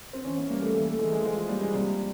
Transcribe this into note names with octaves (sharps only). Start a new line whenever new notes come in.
C4
E3 C#4
B3
G3 A#3
A3
E3
A3
E3 G#3
G#3
F3 G#3
A#2 G3
G#3
C3 G3